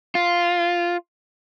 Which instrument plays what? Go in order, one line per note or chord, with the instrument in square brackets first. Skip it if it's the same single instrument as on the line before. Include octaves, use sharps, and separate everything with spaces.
[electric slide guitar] F4